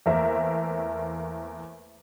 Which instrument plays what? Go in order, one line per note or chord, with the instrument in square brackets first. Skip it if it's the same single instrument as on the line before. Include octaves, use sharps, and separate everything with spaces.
[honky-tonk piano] E2 A3 A#3 A#4 C5 E5